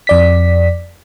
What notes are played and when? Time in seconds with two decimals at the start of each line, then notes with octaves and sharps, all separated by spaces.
0.07 F2 D5 B6